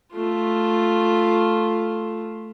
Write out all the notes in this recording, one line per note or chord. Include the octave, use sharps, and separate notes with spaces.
A3 F4